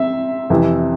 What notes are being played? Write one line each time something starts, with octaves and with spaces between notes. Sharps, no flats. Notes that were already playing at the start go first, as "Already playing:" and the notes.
Already playing: C4 E5
F2 C3 E3